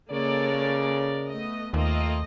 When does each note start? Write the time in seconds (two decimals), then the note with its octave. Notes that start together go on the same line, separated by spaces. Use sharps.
0.11 C#3 G#3 A#3 A4 A#4 C#5 D5
1.29 A3 B3 D#5
1.74 D#2 A3 A#3 C4 F4 D#5